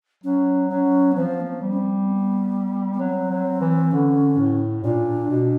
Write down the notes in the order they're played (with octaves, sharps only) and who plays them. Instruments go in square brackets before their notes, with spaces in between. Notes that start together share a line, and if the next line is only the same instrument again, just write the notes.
[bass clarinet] F#3 [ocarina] C#4
[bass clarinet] F#3 [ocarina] C#4
[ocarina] B3
[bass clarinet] F3 [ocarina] C4
[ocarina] A#3
B3
[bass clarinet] G3
[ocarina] C#4
C4
B3
B3
[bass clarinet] F#3 [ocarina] C4
[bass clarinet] F#3
E3
[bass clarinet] D3 [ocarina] C#4
[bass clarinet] A2
[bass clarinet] A#2 [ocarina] D4
[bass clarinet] B2